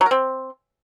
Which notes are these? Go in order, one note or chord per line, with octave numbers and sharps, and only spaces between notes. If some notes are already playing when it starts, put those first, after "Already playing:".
F#3
A#4
C4